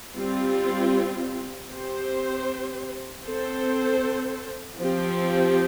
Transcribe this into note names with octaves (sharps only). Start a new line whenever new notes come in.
G3 C4 F4
C4 G4 C5
C4 A4 C5
F3 C4 G4